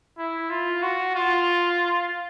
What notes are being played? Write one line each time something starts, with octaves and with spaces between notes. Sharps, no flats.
E4
F4
F#4
F4